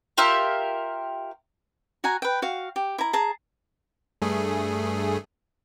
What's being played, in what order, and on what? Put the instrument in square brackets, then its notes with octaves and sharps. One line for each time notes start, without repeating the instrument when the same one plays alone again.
[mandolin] F4 G4 A#4 E5
[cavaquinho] F#4 F#5 G#5 A#5
B4 G5
F#4 F5
G4
E4 A#5
G#4 A5 A#5
[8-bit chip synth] G2 A3 G#4